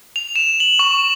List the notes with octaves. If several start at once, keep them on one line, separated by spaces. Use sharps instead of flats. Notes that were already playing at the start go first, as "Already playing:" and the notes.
F7
E7
F#7
C#6